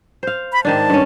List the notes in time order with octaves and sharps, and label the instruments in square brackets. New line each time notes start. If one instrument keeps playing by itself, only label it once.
[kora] C5 F5
[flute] B5
[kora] G#2 D#3 D4 [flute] A5
[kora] G2 C#4